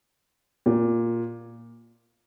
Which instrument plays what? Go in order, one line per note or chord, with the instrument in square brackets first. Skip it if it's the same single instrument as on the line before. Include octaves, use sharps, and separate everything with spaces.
[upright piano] A#2